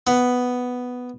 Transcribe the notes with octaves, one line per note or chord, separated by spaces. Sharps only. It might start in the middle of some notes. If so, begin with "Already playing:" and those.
B3